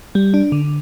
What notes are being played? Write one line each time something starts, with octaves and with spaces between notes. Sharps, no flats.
G3
D4
D3